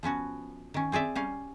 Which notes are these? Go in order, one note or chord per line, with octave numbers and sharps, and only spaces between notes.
F3 B3 C#4 F#4
D#3 C#4
C4 G#4 D5 E5
G3 C#4 F5